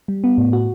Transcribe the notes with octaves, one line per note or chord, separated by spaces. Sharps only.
G3
B3
A2
F#4